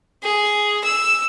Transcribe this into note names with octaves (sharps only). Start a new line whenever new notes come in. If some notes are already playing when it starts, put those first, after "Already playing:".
G#4
E6